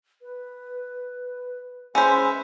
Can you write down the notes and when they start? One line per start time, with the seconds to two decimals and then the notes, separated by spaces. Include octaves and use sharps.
0.22 B4
1.95 G#3 C#4 B4 C5 E5